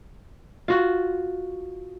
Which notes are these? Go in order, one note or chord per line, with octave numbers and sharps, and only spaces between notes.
F4 F#4